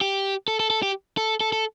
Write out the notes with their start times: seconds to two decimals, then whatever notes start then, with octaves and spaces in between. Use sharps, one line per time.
0.01 G4
0.48 A4
0.60 A4
0.70 A4
0.83 G4
1.17 A4
1.41 A4
1.53 A4